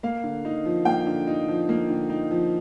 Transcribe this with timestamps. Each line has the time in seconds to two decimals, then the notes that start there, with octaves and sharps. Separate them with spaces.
0.03 A#3 F5
0.24 D3
0.45 D#4
0.65 F3
0.85 A#3 G5
1.06 D3
1.27 D#4
1.48 F3
1.69 A#3
1.90 D3
2.10 D#4
2.31 F3